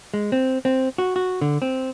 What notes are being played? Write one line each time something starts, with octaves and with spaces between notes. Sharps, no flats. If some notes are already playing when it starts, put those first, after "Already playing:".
G#3
C4
C4
F#4
F#4
D3
C4